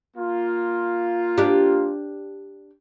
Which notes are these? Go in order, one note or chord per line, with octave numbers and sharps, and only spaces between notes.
A#3 F4
D4 G4